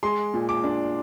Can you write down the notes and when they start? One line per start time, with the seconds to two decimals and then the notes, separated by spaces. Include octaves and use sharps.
0.03 G#3 C6
0.34 A#2
0.49 D6
0.64 D4